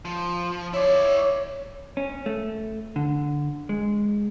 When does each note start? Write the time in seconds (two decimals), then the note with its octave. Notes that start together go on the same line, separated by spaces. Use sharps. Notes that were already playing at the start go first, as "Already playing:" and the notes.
0.05 F3
0.73 E4 C#5 D5
1.97 C#4
2.26 A3
2.96 D3
3.69 G#3